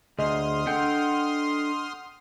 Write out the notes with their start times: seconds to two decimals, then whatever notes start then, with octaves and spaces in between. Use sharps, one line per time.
0.19 D2 G#4 D#5 C6 D#6 F6
0.67 D4 A4 F#5 G5 E6